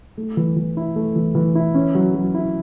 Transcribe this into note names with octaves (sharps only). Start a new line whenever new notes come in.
A3
E3
E3
E4
A3
E3
E3
E4
C#4
F#3
F#3
E4